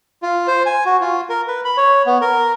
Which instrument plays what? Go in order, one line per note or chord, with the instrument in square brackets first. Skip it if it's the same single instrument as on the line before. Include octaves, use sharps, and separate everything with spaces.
[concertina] F4
C5
G#5
F#4
F4
A#4
B4
B5
C#5
B3
A#4